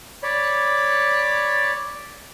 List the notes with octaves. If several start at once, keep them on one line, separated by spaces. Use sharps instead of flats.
C#5 D5 B5